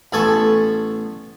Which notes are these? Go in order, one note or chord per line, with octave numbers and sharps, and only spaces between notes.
A1 B3 A4 G#5 A5 C#6